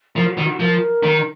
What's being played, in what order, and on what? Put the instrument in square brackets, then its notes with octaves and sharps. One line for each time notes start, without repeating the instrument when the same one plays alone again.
[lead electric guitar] F3 [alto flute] A#4
[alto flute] F#4
[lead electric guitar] D#3
[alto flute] F#4
[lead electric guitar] F3 [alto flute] A#4
[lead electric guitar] D#3